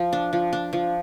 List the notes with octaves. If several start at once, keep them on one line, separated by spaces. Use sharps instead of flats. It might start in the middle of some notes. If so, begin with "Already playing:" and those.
Already playing: F3
D4
F3
D4
F3